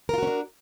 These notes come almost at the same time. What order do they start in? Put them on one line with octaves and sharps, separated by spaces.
A#4 F4 F#4 C#4 D4